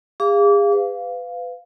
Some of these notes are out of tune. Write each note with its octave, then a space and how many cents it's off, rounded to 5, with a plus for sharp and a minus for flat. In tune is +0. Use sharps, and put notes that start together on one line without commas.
G#4 -35 F5 -15 D6 -30
B4 +30 F5 +0